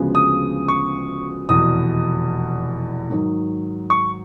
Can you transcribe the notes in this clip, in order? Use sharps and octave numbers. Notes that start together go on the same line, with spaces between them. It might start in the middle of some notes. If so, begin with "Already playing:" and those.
Already playing: D2 C#3 F3 G#3 B3
D#6
C#6
F1 E2 B2 D#6
G#2 D#3 F#3
C#6